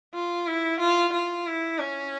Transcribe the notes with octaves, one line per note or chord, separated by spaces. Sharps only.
F4
E4
F4
F4
E4
C#4